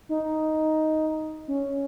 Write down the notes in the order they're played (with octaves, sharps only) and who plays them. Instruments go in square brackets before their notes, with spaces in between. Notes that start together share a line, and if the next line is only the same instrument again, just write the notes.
[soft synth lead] D#4
C#4